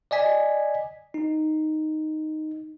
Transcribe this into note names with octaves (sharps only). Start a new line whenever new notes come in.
D5 D#5 G#5 B6
D#4